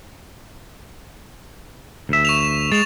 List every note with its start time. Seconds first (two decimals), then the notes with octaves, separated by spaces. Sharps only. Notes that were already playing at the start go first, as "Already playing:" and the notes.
2.09 D2 E5
2.25 C#6 E7 F7
2.72 G#3 A6 E7 F7